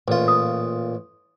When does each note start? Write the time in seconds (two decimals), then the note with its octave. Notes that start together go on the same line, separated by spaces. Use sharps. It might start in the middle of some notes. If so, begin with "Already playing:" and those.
0.08 A1 A#2 F4
0.28 D#6